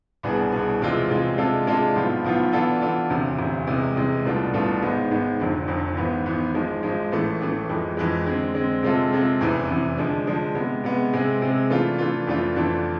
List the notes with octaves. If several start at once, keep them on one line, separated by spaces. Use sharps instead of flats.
C2 B2 B3 D4 G#4
C2 B2 B3 D4 G#4
E2 C3 G#3 C4 F4
E2 C3 G#3 C4 F4
C3 G#3 D4 F4 A4
C3 G#3 D4 F4 A4
B1 A2 F3 B3 F4
B1 A2 F3 B3 F4
E3 B3 D4 F4 A4
E3 B3 D4 F4 A4
E1 D2 C3
E1 D2 C3
E2 C3 G#3
E2 C3 G#3
C2 B2 A3 D4 F4
C2 B2 A3 D4 F4
G#1 G#2 G#3 B3
G#1 G#2 G#3 B3
F1 F2 D3
F1 F2 D3
G#1 G#2 E3 B3
G#1 G#2 E3 B3
G#1 G#2 F3 G#3
G#1 G#2 F3 G#3
A1 A2 E3 A3
A1 A2 E3 A3
F2 E3 G#3
F2 E3 G#3
D3 G#3 C4
D3 G#3 C4
C3 G#3 C4 F4 A4
C3 G#3 C4 F4 A4
F1 E2 C3 E3
F1 E2 C3 E3
D3 F3 G#3 D4
D3 F3 G#3 D4
C3 G#3 B3
C3 G#3 B3
C3 G#3 C4 G#4
C3 G#3 C4 G#4
E3 A3 D4 F4
E3 A3 D4 F4
F2 E3 A3 D4 F4
F2 E3 A3 D4 F4